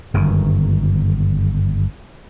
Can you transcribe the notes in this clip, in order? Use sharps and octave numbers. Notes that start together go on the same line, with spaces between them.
G1 F#2 D#3